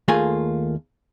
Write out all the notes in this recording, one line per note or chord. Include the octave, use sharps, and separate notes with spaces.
D#2 A3 A#3 F4 G#4 G#5